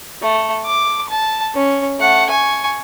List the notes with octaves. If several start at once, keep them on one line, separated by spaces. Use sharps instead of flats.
A3
D6
A5
C#4
A3 F#5
G#5 C#6